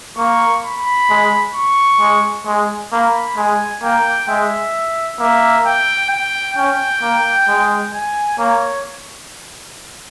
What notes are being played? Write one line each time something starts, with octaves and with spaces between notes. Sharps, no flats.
A#3 C#6
B5
G#3
C#6
G#3
G#3
A#3 B5
G#3 G#5
A#3 G5
G#3 E5
A#3 E5
G5
G5
C#4 G5
A#3
G#3
G#5
A#3 C#5